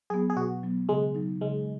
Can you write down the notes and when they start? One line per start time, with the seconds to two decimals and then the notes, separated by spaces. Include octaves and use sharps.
0.10 F#3 B3 G#4
0.30 G#4
0.36 B2 F#4
0.63 F#3 B3
0.89 C#3 G#3
1.14 F#3 D#4
1.41 C#3 G#3